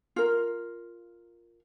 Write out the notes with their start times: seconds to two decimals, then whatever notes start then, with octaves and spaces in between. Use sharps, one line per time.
0.16 F4 A#4